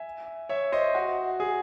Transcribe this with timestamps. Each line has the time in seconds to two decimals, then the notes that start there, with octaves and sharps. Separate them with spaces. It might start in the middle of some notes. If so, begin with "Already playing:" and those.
Already playing: E5 G#5
0.49 C#5 E5
0.72 C5 D#5
0.95 F#4
1.40 G#4